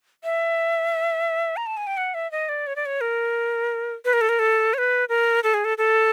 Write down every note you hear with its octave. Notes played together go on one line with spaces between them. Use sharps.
E5
A#5
A5
G#5
G5
F#5
E5
D#5
D5
C#5
D5
C#5
A#4
B4
A#4
A4
A#4
A4
C#5
B4
A#4
A4
G#4
A4
A4